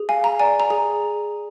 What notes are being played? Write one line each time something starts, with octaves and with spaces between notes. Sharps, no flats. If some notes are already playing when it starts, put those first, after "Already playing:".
Already playing: G#4
F5 G#5
A#5
D5 G#5
A#5
G#4